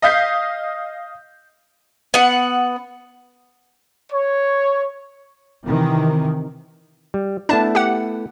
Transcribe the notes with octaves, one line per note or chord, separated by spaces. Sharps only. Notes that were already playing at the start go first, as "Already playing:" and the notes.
D#5 F5 G6 B6 C7
B3 F#5
C#5
C3 D#3 E3
G3
A3 B3 D4 E4 A5
G4 F#5